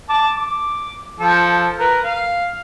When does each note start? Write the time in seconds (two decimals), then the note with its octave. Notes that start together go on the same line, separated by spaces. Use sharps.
0.10 A5 D6
0.36 D6
1.20 F3 A4
1.79 A#4 B4
2.04 F5